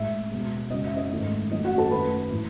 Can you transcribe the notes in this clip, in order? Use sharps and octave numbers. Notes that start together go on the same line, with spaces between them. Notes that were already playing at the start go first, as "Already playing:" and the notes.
Already playing: A2 G#3 E5
B2 G#3
F#2 C#3 G#3 D#5
E5
D#5
G#2 D#3 A3
F#2 D#3 F#3 A3 D#5
F#4 F#5
A4 A5
F#2 D#3 A3 B4 B5
A2 E3 A3